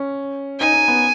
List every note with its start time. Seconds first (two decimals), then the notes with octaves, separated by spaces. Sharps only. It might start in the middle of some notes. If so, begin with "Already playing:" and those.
Already playing: C#4
0.60 D#4 G#5
0.74 D#4
0.88 B3